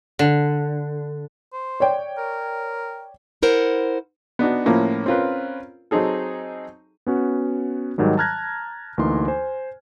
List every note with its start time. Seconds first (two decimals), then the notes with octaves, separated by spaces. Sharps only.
0.19 D3
1.53 C5
1.80 C#5 D5 G5
2.18 A#4
3.42 E4 A#4 C5 F#5
4.39 B3 D4 D#4 F#4
4.66 A2 F3 A#3 C#4 E4
5.06 C4 C#4 F4 A#4 B4
5.91 F#3 C4 D#4 G#4 A4
7.07 B3 C#4 F#4
7.98 G#2 D#3 F#3 G3
8.17 A5 A#5 F6 F#6 G#6 A#6
8.98 D2 E3 A#3 D#4 C6
9.28 C5 G#5